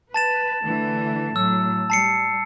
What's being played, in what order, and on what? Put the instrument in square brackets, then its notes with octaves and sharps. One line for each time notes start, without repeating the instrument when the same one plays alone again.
[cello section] B4 [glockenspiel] A5 A6 E7
[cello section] D3 E3 A3
[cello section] A2 F#3 [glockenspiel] E6
[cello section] G3 [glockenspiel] A5 C7 C#7